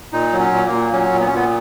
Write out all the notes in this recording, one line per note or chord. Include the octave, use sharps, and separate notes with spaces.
A#2 D#4
F#3
C#4
A#2
A#3
A#2
F#3 C#4
A#2
B3
C#4
A#2 B3